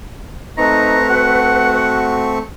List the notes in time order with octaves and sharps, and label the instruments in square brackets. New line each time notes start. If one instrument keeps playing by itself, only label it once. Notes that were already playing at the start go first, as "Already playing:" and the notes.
[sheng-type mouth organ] A3 C4 C#6 [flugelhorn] D#4 [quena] B4 [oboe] A#5
[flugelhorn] F#4 [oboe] F#5